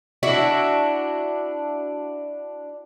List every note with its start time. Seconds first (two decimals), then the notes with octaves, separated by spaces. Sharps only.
0.23 D4 E4 F#4